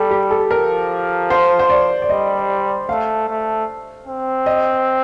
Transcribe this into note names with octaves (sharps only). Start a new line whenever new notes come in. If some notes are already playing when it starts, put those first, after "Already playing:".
Already playing: G3 A4
G4
A4
F3 A#4
C5
C5
D5
D5
G3 D#5
A3 F5
A3
C4
D#5